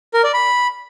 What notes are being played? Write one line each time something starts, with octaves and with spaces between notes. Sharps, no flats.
A#4
D5
B5